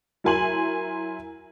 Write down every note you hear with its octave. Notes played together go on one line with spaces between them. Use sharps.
F#3 E4 A#4 G#5 C6 F#7